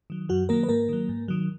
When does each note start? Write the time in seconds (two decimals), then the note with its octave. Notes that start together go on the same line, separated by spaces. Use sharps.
0.10 D#3 F#3
0.29 F#2 F#3 F#4
0.49 D#3 F#3 A#3 A#4
0.63 B4
0.69 G#2 A#3 A#4
0.89 D#3 F#3
1.09 G#2
1.28 D#3 F#3